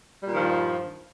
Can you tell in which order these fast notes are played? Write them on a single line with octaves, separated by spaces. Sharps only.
G3 A#2 D#3 F3 G2